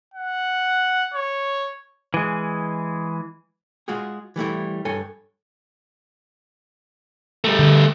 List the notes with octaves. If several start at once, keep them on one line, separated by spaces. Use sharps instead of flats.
F#5
C#5
E3 G#3
G#3 F4 F#4 G#4
E3 G3 A3 E4
G2 A4 C#5 G#5
G3 A3
D3